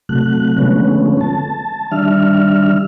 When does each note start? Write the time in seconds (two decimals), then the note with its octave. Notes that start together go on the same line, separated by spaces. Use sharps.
0.09 C3 F#3 A3 F#6
0.58 D3 F3 G#3 A3 B3 C#4
1.21 A5
1.92 D#3 G3 D4 E5 F6